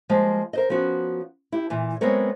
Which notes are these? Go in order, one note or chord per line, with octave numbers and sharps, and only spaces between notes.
F3 G3 G#3 A#3
A#4 C5 D#5
F3 B3 C#4 F#4 A#4
E4 G4
A#2 E3
F#3 G#3 B3 C4 A#4 C#5